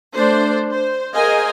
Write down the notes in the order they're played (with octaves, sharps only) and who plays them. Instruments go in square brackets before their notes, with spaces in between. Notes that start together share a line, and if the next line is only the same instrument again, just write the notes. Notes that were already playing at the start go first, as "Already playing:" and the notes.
[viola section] A3 D4 C5
C5
G#4 A#4 C5 D#5 F5 G#5